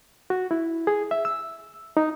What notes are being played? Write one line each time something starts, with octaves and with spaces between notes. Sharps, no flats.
F#4
E4
G#4
E5
E6
D#4